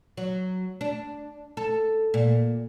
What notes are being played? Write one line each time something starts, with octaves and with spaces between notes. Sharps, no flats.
F#3
D4
A4
A#2